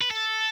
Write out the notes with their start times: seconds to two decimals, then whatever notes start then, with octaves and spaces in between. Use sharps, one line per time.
0.01 B4
0.11 A4